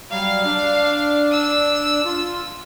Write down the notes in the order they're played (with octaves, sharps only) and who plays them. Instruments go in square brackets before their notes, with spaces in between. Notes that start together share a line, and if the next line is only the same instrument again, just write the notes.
[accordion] F#3 G3 [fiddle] F5
[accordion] D4
[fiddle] E6
[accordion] F4